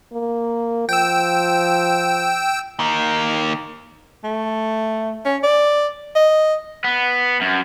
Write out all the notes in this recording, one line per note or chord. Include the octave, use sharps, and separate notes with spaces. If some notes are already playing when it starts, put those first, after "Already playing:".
A#3
F3 G5 E6
D#3 A#3
A3
C#4
D5
D#5
B3
F#2